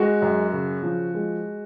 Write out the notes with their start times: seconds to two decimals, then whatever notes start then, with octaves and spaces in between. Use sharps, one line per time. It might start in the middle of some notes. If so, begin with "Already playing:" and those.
Already playing: G#3 F#4
0.22 F#2
0.53 C#3
0.83 F3
1.14 G#3